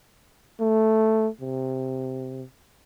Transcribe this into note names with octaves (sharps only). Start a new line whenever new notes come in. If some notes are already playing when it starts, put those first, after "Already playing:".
A3
C3